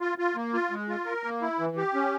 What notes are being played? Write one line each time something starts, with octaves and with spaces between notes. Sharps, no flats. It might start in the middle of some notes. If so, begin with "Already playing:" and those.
F4
F4
A#3
F4
G#3
F4
A#4
A#3
E4
E3
G4
C#4